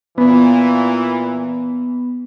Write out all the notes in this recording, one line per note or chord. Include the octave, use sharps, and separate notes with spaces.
A#2 E3 B3